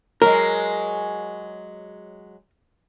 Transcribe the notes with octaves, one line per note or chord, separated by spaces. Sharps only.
F#3 G#3 A#4